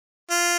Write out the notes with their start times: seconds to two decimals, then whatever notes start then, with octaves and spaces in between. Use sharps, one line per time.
0.30 F4